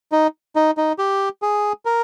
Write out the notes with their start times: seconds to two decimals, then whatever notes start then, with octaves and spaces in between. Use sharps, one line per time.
0.12 D#4
0.56 D#4
0.77 D#4
0.99 G4
1.42 G#4
1.85 A#4